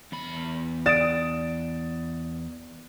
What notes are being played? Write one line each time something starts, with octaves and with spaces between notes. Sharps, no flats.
E2 B5
D5 D#6 A6 D7 E7